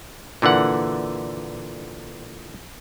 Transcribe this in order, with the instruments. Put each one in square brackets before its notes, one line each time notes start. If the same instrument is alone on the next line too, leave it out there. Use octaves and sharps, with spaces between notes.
[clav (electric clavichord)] A#2 D3 E3 F#5